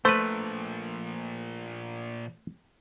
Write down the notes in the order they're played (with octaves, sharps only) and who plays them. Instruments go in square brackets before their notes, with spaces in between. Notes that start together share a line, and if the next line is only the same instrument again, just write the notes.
[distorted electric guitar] A#2 F3 [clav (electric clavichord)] A3 B4 [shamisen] C5